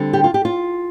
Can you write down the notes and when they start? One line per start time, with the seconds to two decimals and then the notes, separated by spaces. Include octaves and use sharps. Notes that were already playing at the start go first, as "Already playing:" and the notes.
Already playing: D3 G3 C4
0.13 G4
0.24 F4
0.34 G4
0.45 F4